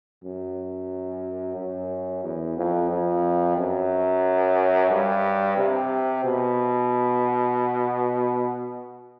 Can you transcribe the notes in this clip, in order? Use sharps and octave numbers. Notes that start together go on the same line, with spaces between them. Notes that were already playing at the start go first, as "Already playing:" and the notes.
F#2
F#2
E2
F2
F2
F#2
G2
C3
B2